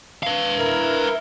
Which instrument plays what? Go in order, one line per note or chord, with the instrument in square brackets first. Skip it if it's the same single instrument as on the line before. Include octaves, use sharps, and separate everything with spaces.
[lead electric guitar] B4 F5
[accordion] E4 A#4